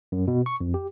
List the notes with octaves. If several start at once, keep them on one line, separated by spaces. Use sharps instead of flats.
F#2
B2
C#6
F2
G4